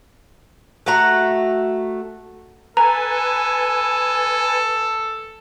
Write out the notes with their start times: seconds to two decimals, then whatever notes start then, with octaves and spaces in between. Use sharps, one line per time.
0.86 A3 F#4 F#5 A#5
2.77 A4 B4 G#5 A#5